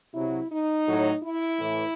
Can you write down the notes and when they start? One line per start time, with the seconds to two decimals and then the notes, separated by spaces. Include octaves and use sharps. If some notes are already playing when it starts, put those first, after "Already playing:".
0.13 C3 F#3 E4
0.50 D#4
0.86 A2 F#3
1.22 E4
1.59 A2 E3